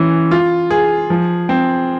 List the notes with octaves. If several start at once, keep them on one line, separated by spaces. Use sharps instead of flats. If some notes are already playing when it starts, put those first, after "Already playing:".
Already playing: E3 C#4
F4
G#4
F3
C4